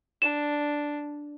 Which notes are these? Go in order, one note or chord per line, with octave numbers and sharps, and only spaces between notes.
D4 E7